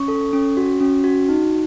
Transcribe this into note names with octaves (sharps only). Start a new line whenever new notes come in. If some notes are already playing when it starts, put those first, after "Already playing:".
Already playing: C#4 C#6
A4
C#4
F#4
C#4
F#4
D#4